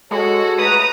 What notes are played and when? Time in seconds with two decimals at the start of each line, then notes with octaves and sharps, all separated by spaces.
0.11 G#3 F#4 A4 C#5
0.58 C#2 A3 B4 A#5 D#6